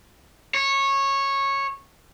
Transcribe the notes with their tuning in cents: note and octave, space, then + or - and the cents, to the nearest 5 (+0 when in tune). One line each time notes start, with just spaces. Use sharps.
C#5 -15